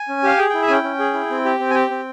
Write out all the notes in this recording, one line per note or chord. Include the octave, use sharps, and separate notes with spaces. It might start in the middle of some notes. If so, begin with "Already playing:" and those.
Already playing: G#5
C#4
G4 F5
G#4 G5
E4 G5
E5
C#4 G5 G#5
C#4
G#4
E4
C4
G4
C4
G#5
G4 G5
C4